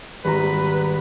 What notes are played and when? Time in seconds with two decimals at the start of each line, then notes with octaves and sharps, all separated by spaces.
0.25 G#1 G3 B4 A#5